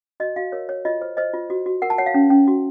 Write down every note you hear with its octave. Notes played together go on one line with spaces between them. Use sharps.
F#4 D#5
F#4 F5
A#4 C#5
C#5
F4 D#5
C5
C5 D#5
F4
F#4
F#4
A#4 F#5
A5
C#5 F#5
F5
C#4
C#4
F#4